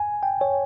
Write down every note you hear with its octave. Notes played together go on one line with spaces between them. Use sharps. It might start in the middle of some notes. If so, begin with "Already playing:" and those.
Already playing: G#5
G5
C#5